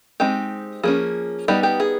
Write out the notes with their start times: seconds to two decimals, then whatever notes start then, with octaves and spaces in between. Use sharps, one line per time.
0.20 G#3 C4 D#4 G4
0.83 F3 A#3 C#4 G#4
1.48 G3 B3 D#4 G4
1.63 G4
1.80 G#4